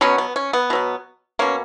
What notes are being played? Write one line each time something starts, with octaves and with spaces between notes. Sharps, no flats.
B2 F#3 B3 C#4
B3
C#4
B3
B2 F#3 B3
B2 A#3 C#4